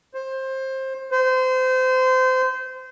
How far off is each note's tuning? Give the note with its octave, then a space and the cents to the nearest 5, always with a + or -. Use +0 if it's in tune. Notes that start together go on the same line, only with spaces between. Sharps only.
C5 +20
C5 -25